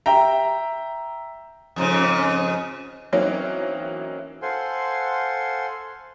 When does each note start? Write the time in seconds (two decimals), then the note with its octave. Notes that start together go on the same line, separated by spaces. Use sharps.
0.06 E5 G5 A#5
1.76 F2 G#2 C#3
3.12 E3 F#3 A#3 C4 C#4 D#4
4.42 A4 C5 F5 F#5 G#5 C6